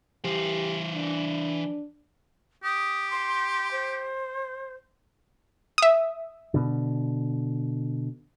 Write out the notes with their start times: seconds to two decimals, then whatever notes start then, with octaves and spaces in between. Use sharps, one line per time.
0.24 E3 G4 C5
0.94 D4
2.64 G4 D#6
3.11 C6
3.71 C5
5.78 E5 D#6
6.54 B2 D3